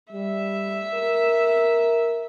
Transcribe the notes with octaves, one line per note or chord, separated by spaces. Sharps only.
G3 E5
A#4